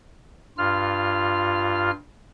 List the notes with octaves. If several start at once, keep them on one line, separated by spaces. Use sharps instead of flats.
G2 F4 F6